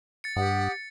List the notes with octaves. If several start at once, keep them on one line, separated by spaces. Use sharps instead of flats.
A6 C#7
G2 G4 F#5 D#6